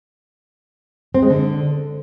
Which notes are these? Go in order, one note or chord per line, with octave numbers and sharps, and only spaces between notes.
C4
G#3
D3